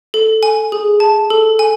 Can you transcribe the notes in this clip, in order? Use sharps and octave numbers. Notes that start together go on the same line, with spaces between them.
A4
G#5
G#4
A5
A4
G#5